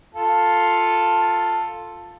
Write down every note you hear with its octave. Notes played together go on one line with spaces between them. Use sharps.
F4 A4